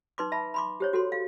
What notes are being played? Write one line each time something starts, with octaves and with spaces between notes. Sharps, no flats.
D#4 B4 C6 D6
E5 A5 B5
B5 C6 D6
G4 C5 C#5
F#4 A4 C6
F5